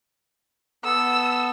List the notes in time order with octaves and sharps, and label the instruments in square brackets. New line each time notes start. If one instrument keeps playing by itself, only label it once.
[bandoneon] B3 A4 [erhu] E6